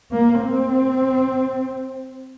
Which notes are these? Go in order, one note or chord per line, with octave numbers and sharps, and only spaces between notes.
A#3
C4